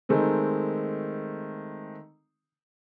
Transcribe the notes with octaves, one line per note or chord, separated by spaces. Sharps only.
D#3 G#3 A3 C4